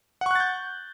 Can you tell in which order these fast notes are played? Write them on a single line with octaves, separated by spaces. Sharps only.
F#5 C#6 F#6 A6 G6